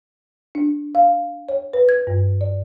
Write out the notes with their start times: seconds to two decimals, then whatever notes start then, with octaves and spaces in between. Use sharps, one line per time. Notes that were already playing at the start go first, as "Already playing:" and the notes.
0.55 D4
0.95 F5
1.49 C#5
1.73 B4
1.89 G#6
2.07 G2
2.41 D5